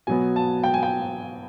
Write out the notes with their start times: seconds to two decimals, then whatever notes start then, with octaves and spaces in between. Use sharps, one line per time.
0.07 B2 F#3 B3 G#5
0.36 A5
0.64 G5
0.74 G#5
0.83 G5